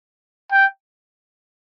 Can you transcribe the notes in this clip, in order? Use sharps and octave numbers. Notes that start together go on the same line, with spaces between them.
G5